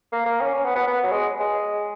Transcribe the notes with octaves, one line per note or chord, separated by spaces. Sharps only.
A#3
A#3
C#4
C#4
B3
B3
B3
F#3
G#3
G#3